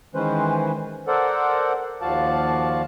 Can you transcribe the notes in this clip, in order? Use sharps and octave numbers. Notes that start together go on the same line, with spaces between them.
D#3 E3 G#3 C#4 B4 C5
A4 A#4 C5 D5 F#5
D#2 F3 F#4 D5 F5 A5